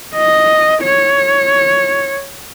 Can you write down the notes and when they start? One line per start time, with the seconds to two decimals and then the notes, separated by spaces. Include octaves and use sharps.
0.15 D#5
0.82 C#5